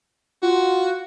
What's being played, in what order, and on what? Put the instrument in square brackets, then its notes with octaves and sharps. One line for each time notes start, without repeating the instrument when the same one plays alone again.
[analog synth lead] F4 [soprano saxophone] F#4